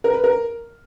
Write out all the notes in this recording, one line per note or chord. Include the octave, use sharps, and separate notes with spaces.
A#4
B4
A#4